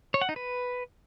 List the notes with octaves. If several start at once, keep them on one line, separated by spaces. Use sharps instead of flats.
C#5
F#5
D#4
B4